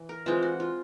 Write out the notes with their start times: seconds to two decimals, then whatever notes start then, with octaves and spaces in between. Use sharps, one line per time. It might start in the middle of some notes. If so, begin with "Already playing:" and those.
Already playing: E3
0.09 A#4
0.26 E3 G#3 C4 F4
0.42 F#4
0.60 F4